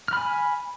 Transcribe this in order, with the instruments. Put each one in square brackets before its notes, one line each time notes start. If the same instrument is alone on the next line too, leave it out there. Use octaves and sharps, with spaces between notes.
[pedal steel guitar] F6
B5
G#5